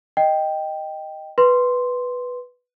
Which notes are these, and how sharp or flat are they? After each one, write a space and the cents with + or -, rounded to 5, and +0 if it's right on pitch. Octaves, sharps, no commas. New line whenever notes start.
D#5 +0 G5 +0
B4 +0 C6 +0